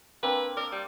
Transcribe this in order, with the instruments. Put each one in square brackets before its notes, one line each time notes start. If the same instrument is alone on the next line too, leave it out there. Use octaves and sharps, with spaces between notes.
[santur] A#3 C4 D4 [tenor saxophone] B4
[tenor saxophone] A#4 [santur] D5
[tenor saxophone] G3